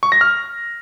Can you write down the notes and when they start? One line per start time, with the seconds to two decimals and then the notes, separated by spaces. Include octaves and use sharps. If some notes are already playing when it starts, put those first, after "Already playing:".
0.03 C#6
0.12 A#6
0.21 F6